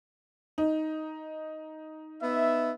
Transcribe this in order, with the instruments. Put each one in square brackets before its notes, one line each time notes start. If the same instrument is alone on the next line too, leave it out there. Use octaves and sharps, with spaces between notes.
[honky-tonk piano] D#4
[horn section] B3 D#4 E5